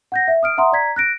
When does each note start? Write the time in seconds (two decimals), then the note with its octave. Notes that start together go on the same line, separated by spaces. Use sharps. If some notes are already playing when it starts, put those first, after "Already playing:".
0.12 F#5 G6 A#6
0.28 E5
0.43 D#6 F6 D7
0.58 E5 F#5 A#5 C6 D#6
0.72 D5 A#5 G#6 B6
0.96 F#6 A#6 D7